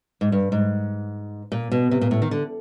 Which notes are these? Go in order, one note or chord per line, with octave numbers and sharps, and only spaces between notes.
G#2
G2
G#2
A#2
B2
C3
A#2
A2
D#3
D3